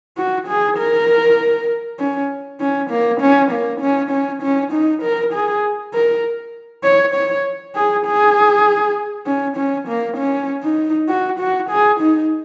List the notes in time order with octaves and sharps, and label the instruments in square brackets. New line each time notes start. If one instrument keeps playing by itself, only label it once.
[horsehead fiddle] F#4
G#4
A#4
C#4
C#4
A#3
C#4
A#3
C#4
C#4
C#4
D#4
A#4
G#4
A#4
C#5
C#5
G#4
G#4
C#4
C#4
A#3
C#4
D#4
F#4
F#4
G#4
D#4